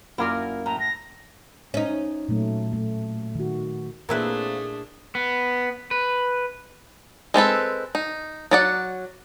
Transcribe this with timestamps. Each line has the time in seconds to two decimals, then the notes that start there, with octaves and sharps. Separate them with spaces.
0.18 F#2 A#3 E4 F4 A#4 D5
0.66 A2 A#5
0.80 A#6
1.74 C#4 D#4
2.28 A#2 F#3 A3
2.73 A3
3.35 D#3 F#4
4.09 A#2 A3 A#3 C4 D4 E4 G#4 B4
5.15 B3
5.91 B4
7.34 G#3 C4 A4 B4
7.95 D#4
8.51 F#3 D5 F#5